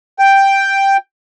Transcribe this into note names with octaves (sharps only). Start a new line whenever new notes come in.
G5